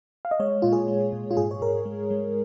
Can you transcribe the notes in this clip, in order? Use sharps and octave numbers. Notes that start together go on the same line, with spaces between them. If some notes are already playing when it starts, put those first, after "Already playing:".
F5
D#5
G#3 C#5
A#2 F4
G#4
G#3
A#2
F4
G#2 G#4
C#5
G#2 A#4
G#3
G#3